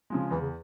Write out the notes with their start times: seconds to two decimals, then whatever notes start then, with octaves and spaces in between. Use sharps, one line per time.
0.10 C#3 F3 G#3
0.31 E2 E3
0.41 C#3